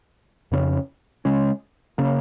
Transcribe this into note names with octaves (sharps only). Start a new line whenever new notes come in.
F2 C#3 A#3 C#4
C#3 G#3 C#4
C#3 A#3 C#4